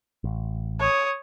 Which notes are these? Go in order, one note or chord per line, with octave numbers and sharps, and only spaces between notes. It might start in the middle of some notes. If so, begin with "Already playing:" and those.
A1
C#5 D#6